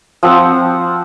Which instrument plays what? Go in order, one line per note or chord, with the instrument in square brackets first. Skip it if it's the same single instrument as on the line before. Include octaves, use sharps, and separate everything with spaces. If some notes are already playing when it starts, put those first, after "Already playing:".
[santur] F3 C4 F#5